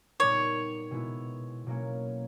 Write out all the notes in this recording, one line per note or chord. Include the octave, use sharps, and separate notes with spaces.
A#2 G3 B3 D#4 C#5
B2 G#3 B3 E4
B2 F#3 A#3 C#4